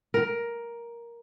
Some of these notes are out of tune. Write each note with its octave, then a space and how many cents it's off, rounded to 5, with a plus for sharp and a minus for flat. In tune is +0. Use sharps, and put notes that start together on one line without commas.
A#4 +10